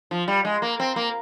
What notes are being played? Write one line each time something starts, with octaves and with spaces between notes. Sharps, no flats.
F3
G3
G#3
A#3
C4
A#3